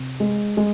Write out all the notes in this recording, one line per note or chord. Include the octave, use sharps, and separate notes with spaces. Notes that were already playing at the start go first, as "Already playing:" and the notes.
Already playing: C3
G#3
G#3